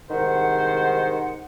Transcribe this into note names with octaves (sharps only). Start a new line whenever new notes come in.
C2 G#2 D#3 C5 F#5